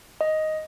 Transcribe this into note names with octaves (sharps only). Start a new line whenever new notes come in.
D#5